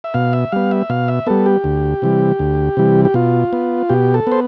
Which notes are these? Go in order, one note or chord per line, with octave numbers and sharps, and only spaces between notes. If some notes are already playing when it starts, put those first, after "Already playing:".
E5
B2 F5
E5
G3 B3 F5
E5
B2 F5
E5
G3 B3 A4
G4
D2
C3 E3 G3
D2
C3 E3 G3
G4
B2 F4
B3
B2 G4
A4
B3 C5